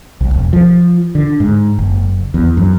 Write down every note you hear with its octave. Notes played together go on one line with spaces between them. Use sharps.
C2
E1
F3
D3
G#2
F#1
E2
F#2